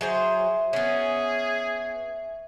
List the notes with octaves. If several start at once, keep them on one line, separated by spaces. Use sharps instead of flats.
F#3 G#4 C5 E5
B3 C#4 G#4